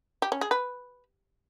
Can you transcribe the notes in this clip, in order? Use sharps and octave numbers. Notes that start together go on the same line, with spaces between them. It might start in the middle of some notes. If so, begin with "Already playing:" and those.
G4
C#4
G#4
B4